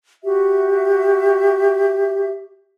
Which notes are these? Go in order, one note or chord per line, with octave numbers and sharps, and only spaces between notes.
F#4 G4 E5